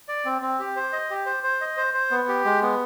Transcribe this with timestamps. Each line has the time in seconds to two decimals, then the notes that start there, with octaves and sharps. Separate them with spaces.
0.08 D5
0.25 C4
0.42 C4
0.59 G4
0.76 C5
0.92 D#5
1.10 G4
1.26 C5
1.43 C5
1.61 D#5
1.77 C5
1.94 C5
2.11 B3
2.28 G4
2.45 G#3
2.62 B3